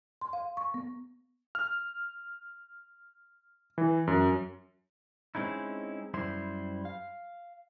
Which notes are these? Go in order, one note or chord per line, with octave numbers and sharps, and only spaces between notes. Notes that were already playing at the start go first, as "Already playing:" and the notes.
C6
F5
C#6
B3
F6
E3
F#2
G#3 C4 C#4 D#4 E4
F#2 G3 E4 C5 C6
F5